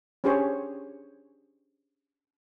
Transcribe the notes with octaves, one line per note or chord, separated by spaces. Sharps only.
C#4 D4 G4 G#4 C5 C#5